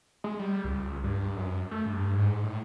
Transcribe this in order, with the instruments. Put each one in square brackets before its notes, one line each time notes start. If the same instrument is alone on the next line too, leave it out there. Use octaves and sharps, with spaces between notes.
[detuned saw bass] G#3
G3
C#2
G2
F#2
A3
G2
G#2
A2